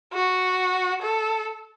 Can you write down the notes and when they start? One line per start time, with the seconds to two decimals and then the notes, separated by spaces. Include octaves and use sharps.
0.13 F#4
1.02 A4